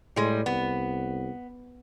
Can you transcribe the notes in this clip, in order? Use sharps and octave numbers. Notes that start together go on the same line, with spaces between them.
A2 G3 G#3
C2 B3